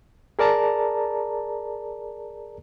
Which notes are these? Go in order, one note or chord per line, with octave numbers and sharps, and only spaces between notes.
G#4 A#4 D5 A5 A#5